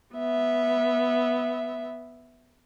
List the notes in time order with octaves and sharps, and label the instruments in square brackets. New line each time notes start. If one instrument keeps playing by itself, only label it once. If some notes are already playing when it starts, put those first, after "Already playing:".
[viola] B3 E5